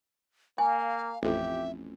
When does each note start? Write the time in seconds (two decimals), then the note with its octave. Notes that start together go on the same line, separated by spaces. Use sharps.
0.58 A#3 F5 G#5
1.23 A1 F2 G4 E5